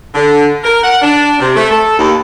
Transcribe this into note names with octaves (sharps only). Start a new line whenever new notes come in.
D3
A#4
F#5
D4
C3
A3
A4
D#2